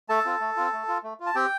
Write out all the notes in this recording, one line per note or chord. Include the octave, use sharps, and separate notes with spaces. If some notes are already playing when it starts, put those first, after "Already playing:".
A3 A4 A5
C4 F4
A3
C4 F4
A3
F4
A3
F4
A5
C4 G4 G5